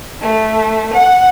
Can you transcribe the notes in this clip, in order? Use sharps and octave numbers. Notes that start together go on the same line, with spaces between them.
A3
F#5